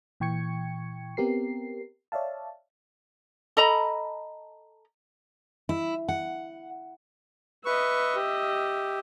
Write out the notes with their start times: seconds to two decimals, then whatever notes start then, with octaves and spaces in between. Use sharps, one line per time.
0.20 A#2 E3 G5 C#6 G#6 C#7
1.17 B3 C4 G4 A#4 C7
2.12 C#5 D5 E5 F5 A5
3.57 A4 D#5 A#5 B5
5.69 E4
6.08 F#5
7.66 B4 D#5 E5 C#6
8.15 G4